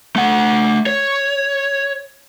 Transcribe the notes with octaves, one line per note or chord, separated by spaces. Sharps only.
A3 F#5
C#5